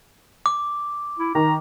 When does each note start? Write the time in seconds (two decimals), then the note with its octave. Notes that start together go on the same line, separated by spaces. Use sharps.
0.46 D6
1.19 E4
1.35 D#3 A#5